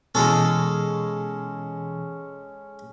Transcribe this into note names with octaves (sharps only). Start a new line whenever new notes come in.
B2 E3 G#3 C#4 A4